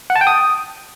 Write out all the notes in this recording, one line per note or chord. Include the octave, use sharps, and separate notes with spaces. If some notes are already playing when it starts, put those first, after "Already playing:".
F#5
A5
G5
D#6